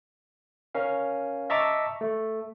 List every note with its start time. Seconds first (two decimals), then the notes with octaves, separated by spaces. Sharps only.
0.75 C#4 A#4 F5
1.50 D#5 E5 A5 A#5 C#6 D6
2.01 A3